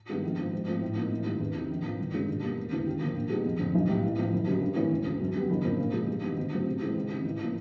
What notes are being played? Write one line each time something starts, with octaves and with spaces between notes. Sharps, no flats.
G2 D#3 G#3 B3
A#1
G#2 F3
G#2
F3 A3 C4
A2
F3 A#3 D#4
A1
G2 D#3
E2
C3 D#3
A#1
A#2 F3
G1
G2 D#3 G#3 C#4
B2
G3 A#3
E1
D2 C#3 E3
D#2
D3 F3 A#3
A#2
G3 B3 D#4 G#4
F1
F2 D3
B1
A2 E3 G3
A1
A2 F3
F#1
F#2 D3 G3
G2
E3 A3 C#4
E1
D2 C#3
F#2
D3 G3 B3
F#1
F2 D3 F3 A#3
A#2
F3 G#3
G2
D#3 G3 B3 D#4
D2
C#3 F#3 A3 C4
C3
E3 G#3 C4
C#2
C3 D#3
A1
F3 A#3